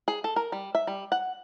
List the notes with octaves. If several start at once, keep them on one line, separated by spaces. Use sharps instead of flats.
G#4
A4
A#4
G3
E5
G3
F#5